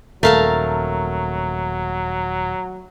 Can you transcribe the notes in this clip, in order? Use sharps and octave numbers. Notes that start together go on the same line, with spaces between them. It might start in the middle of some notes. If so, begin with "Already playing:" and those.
D#1 F#3 A3 A#4 F5 A5